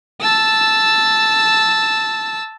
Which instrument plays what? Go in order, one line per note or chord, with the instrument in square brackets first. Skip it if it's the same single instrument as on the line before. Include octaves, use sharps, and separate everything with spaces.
[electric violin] A5 E6